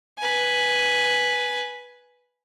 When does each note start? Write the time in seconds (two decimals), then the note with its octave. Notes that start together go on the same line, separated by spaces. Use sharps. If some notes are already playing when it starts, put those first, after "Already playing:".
0.18 B4 G#5